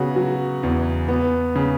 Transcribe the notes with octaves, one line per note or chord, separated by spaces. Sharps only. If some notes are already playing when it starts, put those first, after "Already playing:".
Already playing: C#3 B3 F#4
F#3
E2
B3
C#3